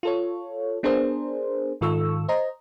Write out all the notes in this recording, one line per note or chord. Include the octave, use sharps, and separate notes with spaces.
F4 A4 C#5
B3 D4 G#4 A#4 C5
G#2 D#3 F4 A4 C#6 E6
C5 D#5 A#5